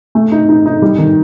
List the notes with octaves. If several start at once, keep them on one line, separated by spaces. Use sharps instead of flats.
A3
D#4
D#4
D#4
G3
D#3